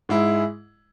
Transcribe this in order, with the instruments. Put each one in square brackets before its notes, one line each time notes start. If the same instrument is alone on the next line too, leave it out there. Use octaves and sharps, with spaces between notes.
[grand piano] G#2 G#3 E4